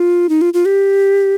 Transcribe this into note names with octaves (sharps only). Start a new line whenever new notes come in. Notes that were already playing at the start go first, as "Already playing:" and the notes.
Already playing: F4
D#4
F4
F4
G4